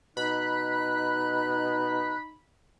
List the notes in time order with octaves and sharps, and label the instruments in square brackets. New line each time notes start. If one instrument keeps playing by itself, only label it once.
[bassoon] B2 [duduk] D#4 [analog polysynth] B5 [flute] F#6